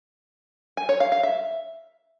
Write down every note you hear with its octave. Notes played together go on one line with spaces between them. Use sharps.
G#5
C#5
F5
F5
E5